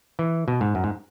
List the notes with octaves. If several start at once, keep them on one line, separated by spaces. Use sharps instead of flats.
E3
B2
G#2
F#2
G#2